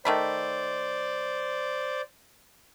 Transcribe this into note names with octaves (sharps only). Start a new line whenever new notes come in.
D#3 A3 C5 D5 B5